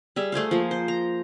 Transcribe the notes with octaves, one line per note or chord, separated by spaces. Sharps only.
G3 G#4 E5
A3 G#4 C5 F5
F3 A#3
C5
A#5